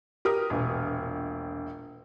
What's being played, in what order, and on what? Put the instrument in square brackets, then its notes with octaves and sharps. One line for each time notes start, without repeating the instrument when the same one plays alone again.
[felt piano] G4 A#4 D#6 F6
E1 A#1